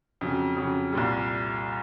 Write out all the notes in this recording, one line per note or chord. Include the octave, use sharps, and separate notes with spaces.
F2 C#3 F#3
F2 C#3 F#3
C2 A#2 G3